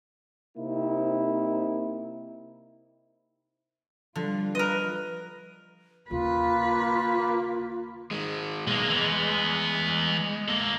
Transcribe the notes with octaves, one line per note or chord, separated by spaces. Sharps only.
C3 A#3 C4 D#4 E4
D3 F3 G3 F4
A#4 B4 D#5
D#2 C#3 A#3 F4 B4
D#3 G#3
B1 G#3 A#3
E3 B3
A#3 A4